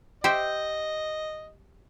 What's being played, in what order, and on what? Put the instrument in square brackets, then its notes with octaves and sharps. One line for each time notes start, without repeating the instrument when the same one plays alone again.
[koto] G4 C5 E5 [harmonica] D#5